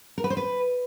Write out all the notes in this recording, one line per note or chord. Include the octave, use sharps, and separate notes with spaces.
A#4
B4
C5
B4